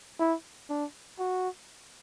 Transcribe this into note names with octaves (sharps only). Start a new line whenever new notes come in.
E4
D4
F#4